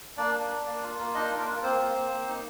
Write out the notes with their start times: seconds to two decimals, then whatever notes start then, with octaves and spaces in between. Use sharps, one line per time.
0.17 A#3 D4 D5
0.34 D4
0.51 D4
0.66 A#3
0.83 F4
0.99 A#3
1.15 D4 D#4 D#5
1.31 F4
1.39 A#3 A#4
1.47 F4
1.63 A#3 C4 C5
1.79 A#3
1.94 A#3
2.11 A#3
2.27 D#4